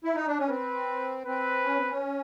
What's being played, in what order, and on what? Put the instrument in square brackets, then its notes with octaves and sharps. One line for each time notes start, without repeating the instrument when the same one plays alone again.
[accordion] E4
D#4
D4
C#4
[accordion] C4 [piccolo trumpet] B4
[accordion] C4 [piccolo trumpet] B4
[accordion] C#4
C4
C#4